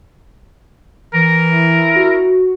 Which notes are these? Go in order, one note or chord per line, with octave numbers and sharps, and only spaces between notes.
E3 A#4
E4
F#4